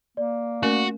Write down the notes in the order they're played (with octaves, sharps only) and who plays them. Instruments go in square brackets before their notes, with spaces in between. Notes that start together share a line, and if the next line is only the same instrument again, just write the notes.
[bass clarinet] A#3 [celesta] D5
[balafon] A3 C#4 A#4 [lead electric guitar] F#4